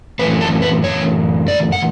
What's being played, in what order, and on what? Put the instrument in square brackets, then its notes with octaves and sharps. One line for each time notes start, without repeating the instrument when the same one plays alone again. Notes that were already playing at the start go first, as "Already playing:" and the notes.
[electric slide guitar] F#2 E3 A3 B4
A4
B4
C#5
D5
F#5